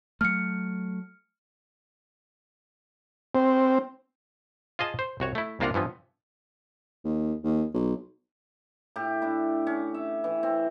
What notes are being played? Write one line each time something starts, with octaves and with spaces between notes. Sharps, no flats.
F#3 A3 F6 C#7
C4
F4 G#4 D#5 A5
C5
C2 F#4 C#5
A3 E4
C2 A#3 D4 F4 F#5 A#5
G2 E3 F3 B3
D#2
D#2
B1
A2 G4
D4 E4
C#4
E5
E3
C4